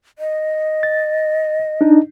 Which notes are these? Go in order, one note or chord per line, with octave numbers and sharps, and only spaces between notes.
D#5
A6
D4 D#4